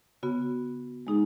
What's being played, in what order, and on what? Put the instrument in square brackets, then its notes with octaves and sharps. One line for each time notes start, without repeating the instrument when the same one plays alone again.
[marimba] C#3 B3 F#4
G#3 D#4 G#4